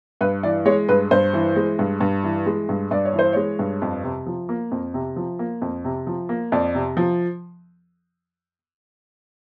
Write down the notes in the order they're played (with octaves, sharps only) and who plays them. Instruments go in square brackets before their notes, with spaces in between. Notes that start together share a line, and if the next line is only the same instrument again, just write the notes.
[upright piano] G2 B4
E3 D5
G#3 C#5
G2 B4
G2 C5
E3
G#3
G2
G2
E3
G#3
G2
G2 D5
C#5
E3
C5
G#3 C#5
G2
F2
C3
F3
A#3
F2
C3
F3
A#3
F2
C3
F3
A#3
F2 D5
C3
F3